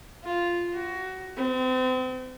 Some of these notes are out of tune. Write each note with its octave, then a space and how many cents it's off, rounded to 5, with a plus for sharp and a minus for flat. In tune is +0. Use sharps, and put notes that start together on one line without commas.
F4 -5
F#4 +20
C4 -35